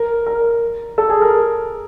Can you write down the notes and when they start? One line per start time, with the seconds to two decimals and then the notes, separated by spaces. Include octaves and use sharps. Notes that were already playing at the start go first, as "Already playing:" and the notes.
Already playing: A#4
0.26 A#4
0.98 A4
1.10 G#4
1.22 A#4